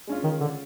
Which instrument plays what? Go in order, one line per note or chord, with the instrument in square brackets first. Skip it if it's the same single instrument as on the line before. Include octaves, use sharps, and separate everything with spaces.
[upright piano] G#3 C#4 F4
[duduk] D#3
D3